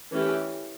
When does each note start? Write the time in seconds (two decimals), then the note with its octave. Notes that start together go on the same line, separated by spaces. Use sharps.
0.11 E3 A3 C#4 G4